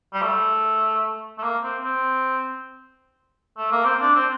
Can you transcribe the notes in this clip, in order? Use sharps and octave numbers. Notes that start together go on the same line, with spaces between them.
G3
A3
A3
A#3
C4
C4
A3
A#3
C4
D4
C4